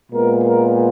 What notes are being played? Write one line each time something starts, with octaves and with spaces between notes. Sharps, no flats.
A#2 G#3 B3 A#4
A#4